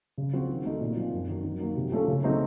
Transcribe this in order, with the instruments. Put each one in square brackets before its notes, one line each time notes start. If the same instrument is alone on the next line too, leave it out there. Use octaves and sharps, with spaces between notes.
[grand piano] C#3
F3 C4 F#4 C5
D#3
A3 D#4 A4
A#2
F3 C4
F#2
D#3 F#3
D#3
F#3 A#3
C3
F3 A3 C#4 A4
C#3
F#3 A3 C4 D#4